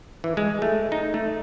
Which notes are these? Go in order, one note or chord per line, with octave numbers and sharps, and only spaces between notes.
E3
G#3
A3
D#4
A3